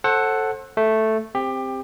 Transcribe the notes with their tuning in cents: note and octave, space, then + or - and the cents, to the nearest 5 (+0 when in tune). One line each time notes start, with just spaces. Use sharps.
A4 +0 C5 +35 F#5 +0
A3 +0 E5 +0
C4 +0 G4 +20